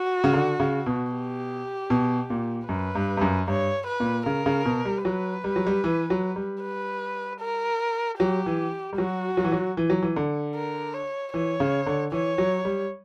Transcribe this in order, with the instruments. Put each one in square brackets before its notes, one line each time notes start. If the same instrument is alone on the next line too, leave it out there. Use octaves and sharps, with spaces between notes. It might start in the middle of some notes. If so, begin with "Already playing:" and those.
Already playing: [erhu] F#4
[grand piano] C#3
D3
C#3
B2
[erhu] G4
[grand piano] B2
A#2
[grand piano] F#2 [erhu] B4
[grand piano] G2
G2
F#2
[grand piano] G2 [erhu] C#5
[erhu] B4
[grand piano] A#2
[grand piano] C#3 [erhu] A#4
[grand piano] C#3
B2
G3
[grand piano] F#3 [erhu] B4
[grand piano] G3
F#3
G3
E3
F#3
G3
[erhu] B4
A#4
[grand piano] F#3 [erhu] G4
[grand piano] E3
G3
[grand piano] F#3 [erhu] F#4
[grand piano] F#3
E3
F#3
E3
F#3
E3
D3
[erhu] A#4
C#5
[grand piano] E3 [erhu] C#5
[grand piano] C#3
D3
[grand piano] E3 [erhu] C#5
[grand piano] F#3
G3